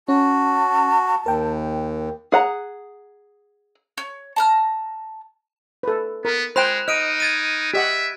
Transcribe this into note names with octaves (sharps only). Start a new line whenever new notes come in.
C#4 F#4 A5
D#2 A#4 G5
G#4 F#5 A#5
C#5
A5 A#5 F6
A4 B4
B3 A#4
G#3 C5 G5 B5 F#6 E7
D#4 D#5 F6 D7 D#7
G#6 A6 D#7
G4 D#5 E5 F#5